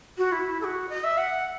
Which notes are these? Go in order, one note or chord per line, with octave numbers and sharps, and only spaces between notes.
F#4
E4
A4
F#4
D#5
E5
F#5